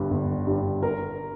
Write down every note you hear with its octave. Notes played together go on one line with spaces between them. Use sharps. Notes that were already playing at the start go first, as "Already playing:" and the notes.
Already playing: G1 G2 G3
G1
G2 G3
A#4